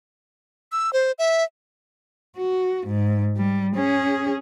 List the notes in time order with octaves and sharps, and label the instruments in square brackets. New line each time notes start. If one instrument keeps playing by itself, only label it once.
[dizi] E6
C5
E5
[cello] F#4
G#2
G3
C#4 G#4